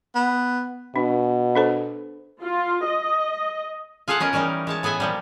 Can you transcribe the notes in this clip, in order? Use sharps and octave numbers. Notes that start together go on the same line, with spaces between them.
B3
B2 D4
D4 A4 C5
F4
D#5
F4 G#4 A4 F5 F#5
B3 C#4 A#4 D#5
E3 G3 C#4 D#4 A#4
G#3 C#5 A5
A2 B3 G#4 E5 G#5
A#2 F3 G3